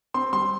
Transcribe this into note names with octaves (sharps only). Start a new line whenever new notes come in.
C4 C6
G3 C6